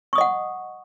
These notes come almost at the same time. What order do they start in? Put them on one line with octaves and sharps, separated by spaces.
C#6 D#6 D#5 F#5